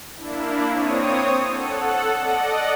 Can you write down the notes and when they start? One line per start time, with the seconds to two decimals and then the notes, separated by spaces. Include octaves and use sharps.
0.16 A#3 D4 E4
0.70 C4 C#5 D#6
1.49 A4 F#5
2.17 D5 D#5 F#5